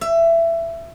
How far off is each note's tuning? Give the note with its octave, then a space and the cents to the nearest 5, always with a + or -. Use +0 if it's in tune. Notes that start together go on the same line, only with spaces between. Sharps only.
E5 +20